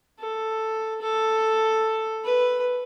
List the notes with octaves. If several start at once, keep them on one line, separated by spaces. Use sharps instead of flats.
A4
A4
B4